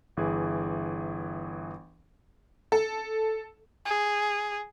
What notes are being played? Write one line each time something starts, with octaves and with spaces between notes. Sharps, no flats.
G1 E3 G#4
A4
G#4